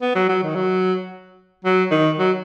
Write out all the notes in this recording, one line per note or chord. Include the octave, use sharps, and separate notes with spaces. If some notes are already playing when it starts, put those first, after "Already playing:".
B3
F#3
F#3
D#3
F#3
F#3
D#3
F#3